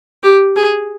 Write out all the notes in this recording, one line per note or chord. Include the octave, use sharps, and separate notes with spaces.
G4
G#4